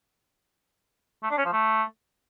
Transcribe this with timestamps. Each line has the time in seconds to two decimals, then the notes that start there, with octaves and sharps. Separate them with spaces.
1.23 A3
1.30 D4
1.38 C#4
1.45 F3
1.53 A3